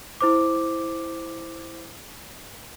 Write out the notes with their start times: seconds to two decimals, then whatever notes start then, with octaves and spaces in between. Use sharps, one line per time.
0.21 E4 C5 D6